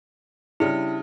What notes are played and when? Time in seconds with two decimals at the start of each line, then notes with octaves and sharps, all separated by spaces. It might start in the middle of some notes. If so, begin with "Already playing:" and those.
0.60 C#3 G3 D4 E4